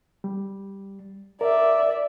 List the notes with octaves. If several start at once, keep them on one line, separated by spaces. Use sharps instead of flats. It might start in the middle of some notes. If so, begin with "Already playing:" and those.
G3
A#4 D5 E5